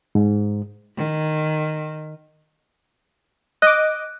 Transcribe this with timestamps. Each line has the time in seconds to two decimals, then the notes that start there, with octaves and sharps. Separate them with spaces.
0.15 G#2
0.97 D#3
3.62 D#5 D6 F#6